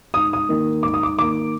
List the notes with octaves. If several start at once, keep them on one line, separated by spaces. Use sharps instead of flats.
G#2 D#6
D#6
D#3 A#3
G#2 D6
D#6
D6
D#3 A#3 D6